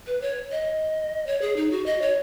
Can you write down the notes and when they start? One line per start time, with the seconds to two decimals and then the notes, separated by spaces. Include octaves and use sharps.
0.07 B4
0.21 C#5
0.52 D#5
1.27 C#5
1.41 G#4
1.56 D#4
1.71 F#4
1.86 D#5
2.02 C#5